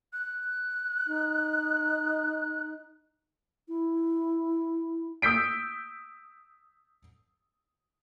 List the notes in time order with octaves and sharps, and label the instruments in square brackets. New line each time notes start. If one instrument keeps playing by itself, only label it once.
[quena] F#6
[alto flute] D#4
[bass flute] E4
[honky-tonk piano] D#6 E6 G6 B6 D7